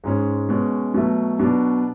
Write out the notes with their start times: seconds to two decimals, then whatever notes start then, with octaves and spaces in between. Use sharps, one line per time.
0.04 G#2 G#3 C#4
0.49 B2 G#3 C#4
0.94 B2 F#3 A3
1.40 B2 F#3 B3 D4